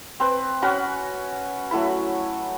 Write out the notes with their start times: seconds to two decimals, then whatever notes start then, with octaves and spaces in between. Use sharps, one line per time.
0.20 C4 B4
0.62 C#4 F#4 F#5 B5
1.71 F#3 A3 E4 B5